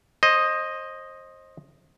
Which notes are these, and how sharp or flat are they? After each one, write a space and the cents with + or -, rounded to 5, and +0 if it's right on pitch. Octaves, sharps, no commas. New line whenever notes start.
C5 +25 D#5 +0